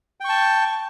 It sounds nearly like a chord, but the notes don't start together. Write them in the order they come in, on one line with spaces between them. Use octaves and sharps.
G5 C#6 A5